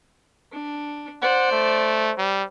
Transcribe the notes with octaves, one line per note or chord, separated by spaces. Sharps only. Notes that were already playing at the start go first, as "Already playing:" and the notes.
D4
C5 D5 F#5
A3
G3